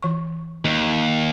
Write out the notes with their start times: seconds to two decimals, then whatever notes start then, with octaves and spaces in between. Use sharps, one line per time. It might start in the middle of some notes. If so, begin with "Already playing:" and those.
0.03 E3 C#6
0.65 D#2